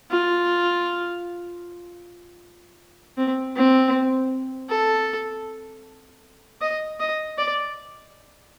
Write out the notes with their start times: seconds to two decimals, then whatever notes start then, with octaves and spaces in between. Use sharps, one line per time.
0.11 F4
3.18 C4
3.56 C4
4.70 A4
6.61 D#5
7.00 D#5
7.38 D5